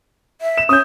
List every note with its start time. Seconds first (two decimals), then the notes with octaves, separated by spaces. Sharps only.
0.41 E5
0.57 E7
0.69 C#4 D#6 G6